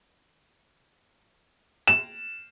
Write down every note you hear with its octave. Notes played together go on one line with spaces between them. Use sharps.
E7